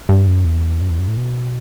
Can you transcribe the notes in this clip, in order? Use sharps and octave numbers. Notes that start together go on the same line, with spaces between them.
G2
F#2
E2
F#2
E2
F#2
A2
B2